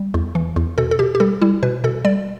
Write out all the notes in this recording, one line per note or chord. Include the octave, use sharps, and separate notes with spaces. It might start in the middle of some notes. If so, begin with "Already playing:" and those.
Already playing: G3
E2
E3
E2
B2 A4
A4
B2 G4
G4
G3 A4
G3 E4
B2 B4
B2 A4
G3 D5